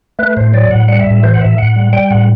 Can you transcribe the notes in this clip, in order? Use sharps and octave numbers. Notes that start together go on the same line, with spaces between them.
A3 B4
A2 C5
F#3 D5
A2 F#5
G3 F#5
E5
A2
E5
E3 C5
F#5
A2 E5
A2 F#5
G3
G3 G5
A2 F#5